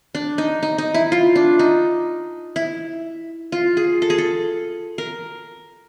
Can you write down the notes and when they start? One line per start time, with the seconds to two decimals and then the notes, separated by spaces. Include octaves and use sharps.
0.15 D4
0.38 D#4
0.63 D#4
0.78 D#4
0.94 E4
1.12 F4
1.36 D4
1.59 D#4
2.56 E4
3.52 F4
3.77 G#4
4.02 A4
4.10 G#4
4.18 A4
4.98 A#4